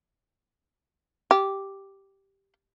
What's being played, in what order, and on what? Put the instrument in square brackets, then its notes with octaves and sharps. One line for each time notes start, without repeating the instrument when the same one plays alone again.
[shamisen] G4